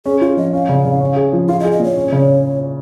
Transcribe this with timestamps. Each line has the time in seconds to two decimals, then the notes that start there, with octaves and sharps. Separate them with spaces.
0.06 C#4 G#4
0.21 F4 G#4
0.37 F3 D#5
0.53 C#4 F5
0.69 C#3
0.85 C#3
1.01 C#4
1.16 G#4
1.33 F3
1.48 F4 F5
1.60 D#5
1.64 G#4
1.72 D#5
1.79 A#2 C#5
1.96 C#4
2.12 C#3